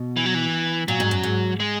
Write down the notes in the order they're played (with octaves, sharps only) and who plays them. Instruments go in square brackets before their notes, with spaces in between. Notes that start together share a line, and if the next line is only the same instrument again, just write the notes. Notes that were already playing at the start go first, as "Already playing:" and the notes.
Already playing: [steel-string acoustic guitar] B2
[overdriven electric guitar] E3
F#3
E3
[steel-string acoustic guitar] A#2 [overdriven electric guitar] F#3
[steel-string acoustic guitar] G#2
F#2
G#2
[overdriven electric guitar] G#3